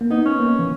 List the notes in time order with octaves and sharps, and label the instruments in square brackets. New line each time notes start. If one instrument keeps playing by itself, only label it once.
[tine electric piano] A#3
[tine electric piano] B3 [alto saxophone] D#4
[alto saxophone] C#4
[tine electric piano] A#3
E3